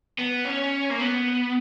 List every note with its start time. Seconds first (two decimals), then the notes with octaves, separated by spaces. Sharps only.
0.19 B3
0.45 C#4
0.90 A#3
0.99 B3